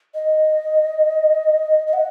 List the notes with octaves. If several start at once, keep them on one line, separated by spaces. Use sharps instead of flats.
D#5
D#5
F#5